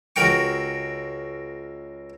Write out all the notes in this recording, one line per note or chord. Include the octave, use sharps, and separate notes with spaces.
C#2 F#4 A#4 G5 C#6